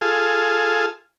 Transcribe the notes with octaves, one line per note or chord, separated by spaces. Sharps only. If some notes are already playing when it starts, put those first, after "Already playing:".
F4 G#4 A4